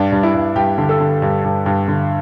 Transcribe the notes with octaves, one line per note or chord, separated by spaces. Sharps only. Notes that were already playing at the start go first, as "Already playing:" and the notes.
Already playing: G2 D4
G2
E4
G2
G2 G4
D3
A4
D3
G2
G2
G2
D3